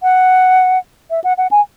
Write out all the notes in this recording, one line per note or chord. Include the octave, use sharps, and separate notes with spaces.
F#5
E5
F#5
F#5
G#5